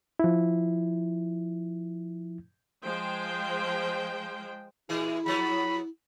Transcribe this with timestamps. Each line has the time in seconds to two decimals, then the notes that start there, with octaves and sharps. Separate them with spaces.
0.19 F3 E4
2.85 F3 G#3 C5 G5
4.89 A#2 E3 E4 G#4
5.26 F3 F#3 B3 B5